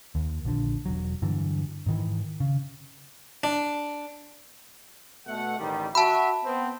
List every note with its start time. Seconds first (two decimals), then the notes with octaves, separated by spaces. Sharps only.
0.15 D#2
0.45 A#1 D3
0.86 E1 F#3
1.22 G2 D3 E3 F#3
1.86 G#2 D#3 E3
2.40 C#3
3.44 D4
5.27 B2 A3 F#5
5.58 A1 D#3 G3
5.95 F#4 E5 A5 B5
6.45 B3 C4